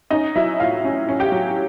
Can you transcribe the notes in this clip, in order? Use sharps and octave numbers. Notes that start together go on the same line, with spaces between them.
C#4 D#4 D#5
F#3 E4 E5
A2 F4 F5
C#4
C#4
G4 G5
F#3